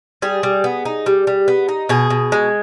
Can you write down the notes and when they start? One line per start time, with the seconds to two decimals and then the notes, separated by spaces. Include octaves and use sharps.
0.22 G3 G#4
0.43 G3
0.64 B3
0.85 D#4
1.06 G3
1.27 G3
1.48 B3
1.69 D#4
1.89 B2 G#4
2.10 B2
2.32 G#3